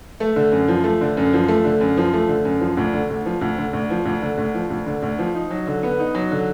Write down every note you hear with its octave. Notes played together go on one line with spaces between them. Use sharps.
A3
D3
F#2
F3
A3
D3
F#2
F3
A3
D3
F#2
F3
A3
D3
F#2
F3
D2
D3
D2
F3
D2
D3
D2
F3
D2
D3
D2
F3
D2
D3
D2
F3
D#4
F#3
D3
B3
D#4
F#3
D3